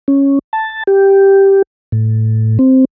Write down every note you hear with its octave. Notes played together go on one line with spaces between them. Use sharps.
C#4
A5
G4
A2
C4